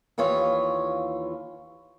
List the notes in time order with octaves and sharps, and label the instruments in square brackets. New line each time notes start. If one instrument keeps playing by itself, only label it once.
[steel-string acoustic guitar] D#2 E3 F4 C#5 F5